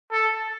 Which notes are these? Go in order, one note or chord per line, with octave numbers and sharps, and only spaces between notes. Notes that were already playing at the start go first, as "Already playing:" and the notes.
A4